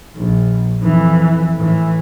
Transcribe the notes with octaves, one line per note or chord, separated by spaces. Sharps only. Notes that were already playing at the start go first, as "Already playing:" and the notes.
A#1
F2 E3
A2 E3